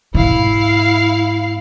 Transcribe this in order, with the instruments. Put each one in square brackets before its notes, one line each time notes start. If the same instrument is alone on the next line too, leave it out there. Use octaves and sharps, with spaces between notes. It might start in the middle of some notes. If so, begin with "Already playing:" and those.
[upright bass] G#2 B2 [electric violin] E4 F5